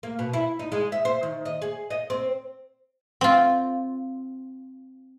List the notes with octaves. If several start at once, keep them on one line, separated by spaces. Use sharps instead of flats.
A#3
B2
E4
D#4
G#3
E5
C5
D#3
D#5
G#4
D#5
C4
C4 F4